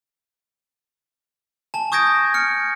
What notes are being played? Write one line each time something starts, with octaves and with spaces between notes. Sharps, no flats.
G#5 A5
C#6 D#6 G6 G#6 A#6 D7
F6 C#7